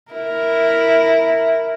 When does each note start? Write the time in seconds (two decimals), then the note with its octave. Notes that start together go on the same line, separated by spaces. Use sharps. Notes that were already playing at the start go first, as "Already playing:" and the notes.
0.12 E4 A#4